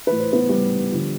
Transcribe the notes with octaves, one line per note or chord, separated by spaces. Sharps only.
A2 E3 B4
C5
B3 B4
G3 G4
D3 F3